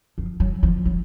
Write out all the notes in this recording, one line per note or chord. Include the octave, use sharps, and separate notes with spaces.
F3
F#3
F3
F#3